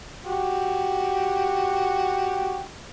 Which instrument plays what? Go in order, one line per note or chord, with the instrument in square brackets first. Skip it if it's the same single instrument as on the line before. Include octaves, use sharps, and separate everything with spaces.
[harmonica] F#4 G4